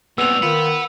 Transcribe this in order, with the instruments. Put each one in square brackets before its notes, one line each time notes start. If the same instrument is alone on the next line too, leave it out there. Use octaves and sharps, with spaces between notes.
[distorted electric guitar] A#2 G3 [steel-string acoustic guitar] B3 C4 [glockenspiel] E6 F7
[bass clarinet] D#3 [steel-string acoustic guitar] F4 [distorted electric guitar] F#5 B5